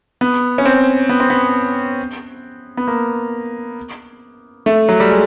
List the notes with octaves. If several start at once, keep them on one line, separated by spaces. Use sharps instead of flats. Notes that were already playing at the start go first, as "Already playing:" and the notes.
B3
C#4
C4
B3
C4
B3
B3
A#3
A3
F#3
G3
G#3